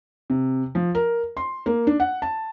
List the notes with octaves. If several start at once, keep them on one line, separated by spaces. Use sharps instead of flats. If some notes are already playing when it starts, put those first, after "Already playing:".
C3
F3
A#4
C6
A#3
D4
F#5
A5